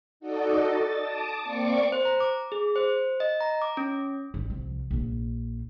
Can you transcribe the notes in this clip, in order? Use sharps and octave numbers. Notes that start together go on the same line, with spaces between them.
D#4 F#4 A4 D5 D#5
A6
A5 D6 D#6
A#3 C4 D5 C#6 D6
C5
A#5
D6
G#4
C5
D#5
A#5
D6
C#4
A1
C2 F3
A#1 D4